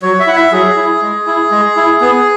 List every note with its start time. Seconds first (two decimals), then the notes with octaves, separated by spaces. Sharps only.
0.02 F#3 C#5
0.19 E5
0.27 E4 F#5
0.36 E5
0.52 F#3 G#4
0.77 E4
1.02 G#3
1.27 E4
1.51 G#3
1.76 E4
2.01 B3